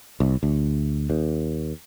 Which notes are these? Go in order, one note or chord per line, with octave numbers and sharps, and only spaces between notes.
C2
D2
D#2